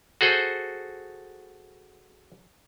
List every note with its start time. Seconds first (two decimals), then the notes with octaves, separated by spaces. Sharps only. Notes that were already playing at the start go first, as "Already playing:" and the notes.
0.21 F#4 G#4 A4 C5